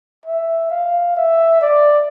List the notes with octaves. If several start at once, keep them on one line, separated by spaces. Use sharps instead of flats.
E5
F5
E5
D5